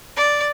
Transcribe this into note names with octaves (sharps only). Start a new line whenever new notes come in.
D5